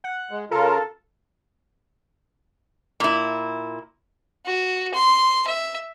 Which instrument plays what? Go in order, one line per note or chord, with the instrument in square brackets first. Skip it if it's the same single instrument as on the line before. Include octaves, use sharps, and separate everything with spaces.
[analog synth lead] F#5
[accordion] G#3
[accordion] C#3 F4 A#4 [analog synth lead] A4
[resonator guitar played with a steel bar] A#2 E4
[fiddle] F#4
C6
E5